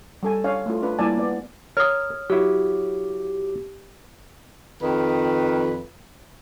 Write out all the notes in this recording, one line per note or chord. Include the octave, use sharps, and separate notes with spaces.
G3 A4 G#5
D4 C#5 F5 G#5
A3 F4
D4 F4 B4
G3 A#3 E4 D5 G#5 A5
B3 D5
A#4 C#5 D#6 F6
F#3 E4 G4
F2 D#3 B4